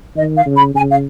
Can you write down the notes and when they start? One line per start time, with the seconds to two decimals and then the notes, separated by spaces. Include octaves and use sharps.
0.16 D#3 D#5
0.36 F5
0.46 C#3
0.55 B5
0.74 C#3 G#5
0.90 F5